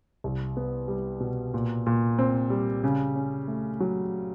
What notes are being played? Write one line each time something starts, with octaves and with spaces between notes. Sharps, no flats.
C2
B3
G3
B2
A#2
A#2
C4
G3
C#3
C#4
A3
F#3